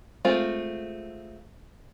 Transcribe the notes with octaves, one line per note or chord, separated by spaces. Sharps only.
G#3 A3 C4 F4